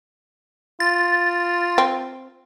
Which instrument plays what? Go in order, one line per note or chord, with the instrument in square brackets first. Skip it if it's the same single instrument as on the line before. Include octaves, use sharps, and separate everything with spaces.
[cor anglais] F4 [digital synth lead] A6
[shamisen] C4